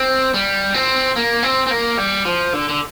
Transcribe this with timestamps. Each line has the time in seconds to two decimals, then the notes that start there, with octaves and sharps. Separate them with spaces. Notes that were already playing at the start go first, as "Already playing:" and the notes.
Already playing: C4
0.34 G3
0.74 C4
1.16 A#3
1.43 C4
1.67 C4
1.71 A#3
1.97 G3
2.25 F3
2.53 D3
2.69 D3